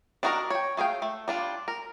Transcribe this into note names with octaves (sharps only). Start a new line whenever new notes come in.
D4 D#4 F#4 A4 A#4
C#5 G5
A3 G#4 F5 G5
A3
G3 D4 F4
A#4